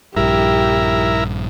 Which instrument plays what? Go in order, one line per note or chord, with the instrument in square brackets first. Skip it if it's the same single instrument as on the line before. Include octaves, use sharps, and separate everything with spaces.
[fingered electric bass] A#1 G2 [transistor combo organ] E4 A#4 [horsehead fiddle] G4